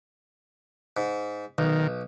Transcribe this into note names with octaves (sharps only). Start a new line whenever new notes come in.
G#2
B1 D#3